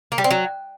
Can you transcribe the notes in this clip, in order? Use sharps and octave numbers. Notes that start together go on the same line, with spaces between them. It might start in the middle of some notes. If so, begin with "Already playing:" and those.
A#3
G3
C4
F#3